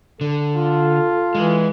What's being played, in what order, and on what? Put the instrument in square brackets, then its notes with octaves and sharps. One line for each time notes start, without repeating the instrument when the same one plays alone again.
[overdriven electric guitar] D3 [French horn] A4
[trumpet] F4
[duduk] E3 [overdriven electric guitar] G#3